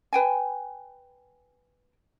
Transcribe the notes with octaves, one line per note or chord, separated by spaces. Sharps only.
B4 G5 G#5